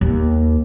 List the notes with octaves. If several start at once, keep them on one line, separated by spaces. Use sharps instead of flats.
D#2